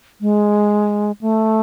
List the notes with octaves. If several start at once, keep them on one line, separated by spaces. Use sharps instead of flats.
G#3
A3